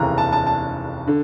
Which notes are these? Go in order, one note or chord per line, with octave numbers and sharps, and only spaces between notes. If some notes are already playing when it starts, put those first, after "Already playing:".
Already playing: F1 D#2 C#3 E3 A#5
A5
A5
A5
D3